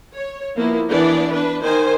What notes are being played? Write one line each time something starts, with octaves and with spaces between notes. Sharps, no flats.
C#5
F3 A#3 B3 E4
E3 B3 D4 D5
D4 B4
D#3 C5 G#5